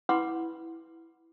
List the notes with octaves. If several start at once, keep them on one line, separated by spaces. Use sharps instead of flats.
E4 B4 F#5 B5 C6 D6